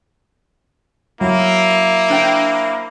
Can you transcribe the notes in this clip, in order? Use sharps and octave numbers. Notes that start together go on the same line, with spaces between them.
F#3 A#3 E4
F#2
D4 C5 G5